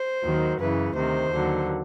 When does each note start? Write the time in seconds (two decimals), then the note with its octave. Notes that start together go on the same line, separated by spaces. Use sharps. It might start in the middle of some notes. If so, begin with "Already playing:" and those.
Already playing: C5
0.24 D#2 D#3 F#3
0.60 F#2 C#3 E3 B4
0.96 D2 C3 D#3 C5
1.32 D#2 D3 F#3